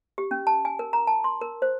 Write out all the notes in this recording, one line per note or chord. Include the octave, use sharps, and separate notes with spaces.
G4
C#4
A5
G#5
A#4
A#5
A5
C6
A#4
C5